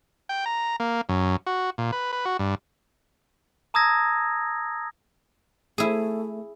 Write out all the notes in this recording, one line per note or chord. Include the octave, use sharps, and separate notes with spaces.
G5
A#5
A#3
F#2
F#4
A#2
B4
B4
F#4
G2
A5 A#5 D#6 E6 G#6 A#6
A3 E4 G#4